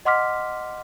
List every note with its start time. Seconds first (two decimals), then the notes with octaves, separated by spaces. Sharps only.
0.05 D#5 F#5 C6 D6 F6 B6